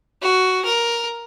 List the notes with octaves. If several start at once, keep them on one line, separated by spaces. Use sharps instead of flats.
F#4
A#4